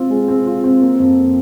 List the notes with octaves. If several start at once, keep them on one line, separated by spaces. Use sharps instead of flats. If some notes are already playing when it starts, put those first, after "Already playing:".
Already playing: C4 F4
G#3
C4
F4
C4
A#3
F2